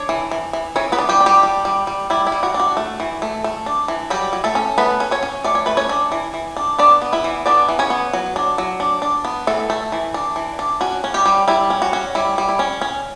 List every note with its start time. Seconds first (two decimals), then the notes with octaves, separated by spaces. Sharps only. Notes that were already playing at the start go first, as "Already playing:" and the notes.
Already playing: D4 C#5
0.09 E3
0.31 E3
0.53 E3
0.76 E3 C#4 C#5
0.92 B3 B4
0.99 D4
1.09 G3 G4
1.21 D4
1.26 G3 G4
1.43 G3
1.65 G3
1.87 G3
2.10 G3 E4
2.27 E4
2.32 G3
2.43 F#4
2.54 D4
2.60 F#4
2.77 A3
3.00 E3
3.22 A3
3.44 A3
3.66 D4
3.88 E3
4.10 F#3 G3 G4
4.33 F#3
4.44 A3 A4
4.55 C#4
4.78 A3 B3 B4
5.00 C#4
5.11 C#4 C#5
5.23 C#4
5.44 A3 D5
5.55 C#5
5.66 A3 B4
5.77 C#4 C#5
5.89 D4
6.12 E3
6.34 E3
6.57 D4
6.79 B3 D4 D5
7.02 B3
7.13 E4 E5
7.24 E3
7.46 B3 D4 D5
7.69 E3
7.79 C#4 C#5
7.90 B3
8.13 F#3
8.36 D4
8.58 F#3
8.80 D4
9.02 D4
9.25 B3
9.47 E3 A3 A4
9.70 A3
9.92 E3
10.14 D4
10.36 E3
10.59 D4
10.81 C#4 F#4
11.04 C#4
11.14 G3 G4
11.26 G3
11.48 G3 E4
11.70 C#4
11.82 F#4
11.93 C#4
12.15 G3 E4
12.38 G3
12.49 E4
12.59 C#4
12.81 C#4